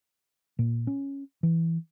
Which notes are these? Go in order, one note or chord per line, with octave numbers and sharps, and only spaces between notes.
A#2
C#4
E3